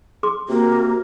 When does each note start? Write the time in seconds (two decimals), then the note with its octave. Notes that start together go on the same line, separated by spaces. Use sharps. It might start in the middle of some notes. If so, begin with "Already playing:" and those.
0.23 G#4 C6 D6
0.49 C3 A#3 F#4